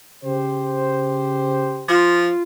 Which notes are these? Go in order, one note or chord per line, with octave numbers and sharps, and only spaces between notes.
C#3 G4 C5
F3 F4